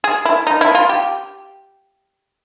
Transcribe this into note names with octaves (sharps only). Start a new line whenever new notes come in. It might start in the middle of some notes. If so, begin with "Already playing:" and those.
G#4
E4
D#4
E4
F4
G4